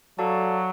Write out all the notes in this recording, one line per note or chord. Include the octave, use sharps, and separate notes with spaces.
F#3 F#4 A4 D5 F5 A5